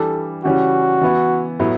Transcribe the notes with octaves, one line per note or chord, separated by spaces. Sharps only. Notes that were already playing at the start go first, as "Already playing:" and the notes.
Already playing: E3 G3 D4 A4
C#3 E3 G3 C#4 F#4
E3 B3 E4
A2 F#3 B3 E4